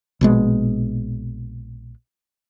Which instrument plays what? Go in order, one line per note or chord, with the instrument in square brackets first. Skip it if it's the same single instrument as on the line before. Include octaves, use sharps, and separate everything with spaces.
[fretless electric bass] A#1 B2 G#3